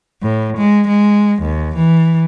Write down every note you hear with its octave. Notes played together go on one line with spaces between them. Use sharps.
A2
G#3
G#3
D#2
E3